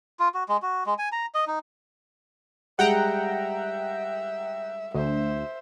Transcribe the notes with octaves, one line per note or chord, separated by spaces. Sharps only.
F4
F#4
G#3
F#4
G#3
G#5
A#5
D#5
D#4
G3 G#3 E5 F#5 G5 A#5
D2 C5 E5